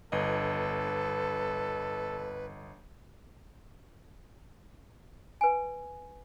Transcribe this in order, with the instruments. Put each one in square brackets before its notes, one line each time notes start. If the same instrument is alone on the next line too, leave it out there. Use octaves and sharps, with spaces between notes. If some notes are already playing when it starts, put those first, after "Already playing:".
[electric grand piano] G1 D#5 [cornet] A4 [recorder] B4
[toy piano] B4 G#5